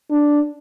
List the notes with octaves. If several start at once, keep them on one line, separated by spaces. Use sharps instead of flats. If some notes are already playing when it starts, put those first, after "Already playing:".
D4